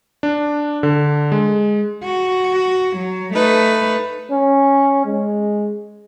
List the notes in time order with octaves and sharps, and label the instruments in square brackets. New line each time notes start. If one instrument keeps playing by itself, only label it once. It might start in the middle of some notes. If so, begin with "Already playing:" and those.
[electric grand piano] D4
D3
G#3
[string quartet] F#4
F#3
A3 D#4 B4
[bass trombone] C#4
G#3